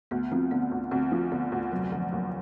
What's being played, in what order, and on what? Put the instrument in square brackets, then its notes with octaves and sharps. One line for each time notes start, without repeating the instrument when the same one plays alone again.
[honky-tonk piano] D2 [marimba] B3
[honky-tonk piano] F3 [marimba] C4
[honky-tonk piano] D3 [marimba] B3
[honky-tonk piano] D2
[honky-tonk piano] D2 [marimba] C4
[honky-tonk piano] F3
[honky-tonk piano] D3 [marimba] B3
[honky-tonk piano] D2
[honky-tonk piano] F1 [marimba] F#3
[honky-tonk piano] D3 [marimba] F3
[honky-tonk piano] D#2 [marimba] F#3